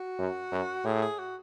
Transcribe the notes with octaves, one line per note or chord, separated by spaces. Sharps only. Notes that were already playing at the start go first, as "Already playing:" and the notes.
Already playing: F#4
F#2
F#2
A2 G#4
G#4
F#4